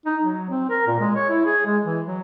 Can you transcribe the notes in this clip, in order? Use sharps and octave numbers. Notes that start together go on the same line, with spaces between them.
D#4
F#3
C4
A#4
A#2
G#3
C#5
E4
G#4
G#3
E3
F#3